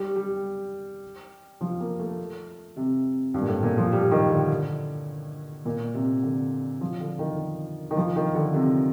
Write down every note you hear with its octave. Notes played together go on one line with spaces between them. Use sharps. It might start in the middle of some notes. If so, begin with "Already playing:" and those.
Already playing: G3
G3
F3
A#3
A3
C3
G2
A#2
A2
A#2
F3
G3
D#3
D3
A#2
C3
D3
F3
D3
D#3
D#3
F3
D#3
D3
C3